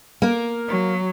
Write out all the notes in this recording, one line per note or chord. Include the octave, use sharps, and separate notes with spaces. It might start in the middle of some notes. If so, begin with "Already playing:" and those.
A#3 A#4
F#3